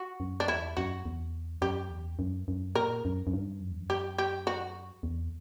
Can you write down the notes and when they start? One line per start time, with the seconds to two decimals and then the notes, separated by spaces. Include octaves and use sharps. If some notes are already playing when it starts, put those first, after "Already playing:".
Already playing: F#4
0.20 F#2
0.40 D4
0.48 E2 E4
0.77 F#2 F#4
1.06 E2
1.62 F#2 G4
1.90 E2
2.19 F#2
2.48 F#2
2.75 A#2 A#4
3.05 F#2
3.27 F#2
3.33 G2
3.61 F#2
3.71 E2
3.80 F#2
3.90 G4
4.18 G4
4.47 F#4
5.03 E2